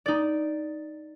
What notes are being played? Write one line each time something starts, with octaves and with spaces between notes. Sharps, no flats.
D#4 D5